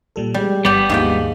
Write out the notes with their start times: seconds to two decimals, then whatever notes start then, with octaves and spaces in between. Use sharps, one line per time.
0.16 A#2 G3 A4
0.34 G3 G#3 B3
0.65 G1 G3 B3 G4 D5
0.89 D#2 G#2 F3 A#3 G5